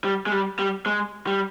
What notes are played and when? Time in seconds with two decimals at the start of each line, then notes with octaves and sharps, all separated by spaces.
0.04 G3
0.26 G#3
0.32 G3
0.59 G3
0.86 G#3
1.27 G3